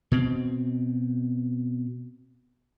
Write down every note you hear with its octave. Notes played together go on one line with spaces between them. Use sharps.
B2 C4